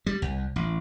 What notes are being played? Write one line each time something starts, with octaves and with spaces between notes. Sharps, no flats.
G3
C2
A1